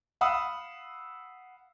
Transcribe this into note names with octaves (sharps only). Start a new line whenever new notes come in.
F5 F#5 B5 D#6 E6